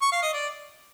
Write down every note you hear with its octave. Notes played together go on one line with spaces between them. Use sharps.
C#6
F5
D#5
D5